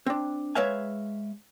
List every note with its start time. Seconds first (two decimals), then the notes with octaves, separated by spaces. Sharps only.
0.06 C4 D4
0.55 G#3 B4 C#5 E5 F5 G#5